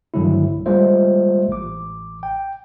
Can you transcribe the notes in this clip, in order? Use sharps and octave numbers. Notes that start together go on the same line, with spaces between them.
G2 D3 D#3 F#3 A3 E4
B1
G3 G#3 A#3 F4 C5 E5
A1 D6
G5